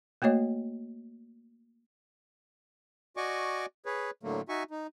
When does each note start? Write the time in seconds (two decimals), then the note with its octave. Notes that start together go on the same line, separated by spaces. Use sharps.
0.22 A3 A#3 F#4 C#5 D#5
3.17 F#4 D5 D#5 G#5 C#6 D6
3.86 G#4 B4 C#5
4.23 A2 D3 F#3 A3 A#3
4.49 D#4 F#4 E5 G#5 C#6
4.71 D#4